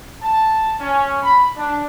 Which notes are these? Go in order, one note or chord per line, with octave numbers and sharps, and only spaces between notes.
A5
C#4
B5
D4